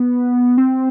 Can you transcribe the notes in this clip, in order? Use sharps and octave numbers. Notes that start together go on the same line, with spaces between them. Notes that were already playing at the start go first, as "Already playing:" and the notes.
Already playing: B3
C4